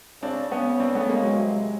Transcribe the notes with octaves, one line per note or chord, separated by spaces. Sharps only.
C#3 C4 D4
C#3 B3 C#4
C4 D4
A3 B3
G#3 A#3
F#3 G#3
C3